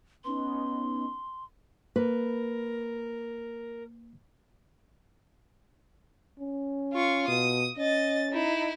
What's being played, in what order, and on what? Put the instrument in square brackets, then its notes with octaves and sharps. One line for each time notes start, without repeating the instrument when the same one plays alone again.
[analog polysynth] B3 C#4 D#4 [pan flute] C6
[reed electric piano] A#3 [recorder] A#4 [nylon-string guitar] B4
[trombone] C#4
[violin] F4 C#6
[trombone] B2 [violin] D#6
[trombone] C#4 [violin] D#5 A6
[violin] D#4 E4